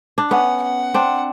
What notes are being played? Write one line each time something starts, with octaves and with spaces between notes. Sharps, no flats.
D4
B3 C#4 F#5
F#5
C4 D4